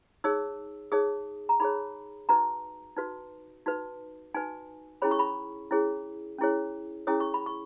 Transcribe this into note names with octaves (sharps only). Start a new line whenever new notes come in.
D#4 G#4 C#5 E6
D#4 G#4 C#5 D#6
A#5
D#4 G#4 C#5 B5
D#4 F#4 B4 A#5
D#4 F#4 B4
D#4 F#4 B4
D#4 F#4 B4 G#5
C#4 E4 G#4 C#5 B5
C#6
B5
C#4 E4 G#4 C#5
C#4 E4 G#4 C#5
C#4 E4 G#4 C#5 D#6
C#6
B5
C#6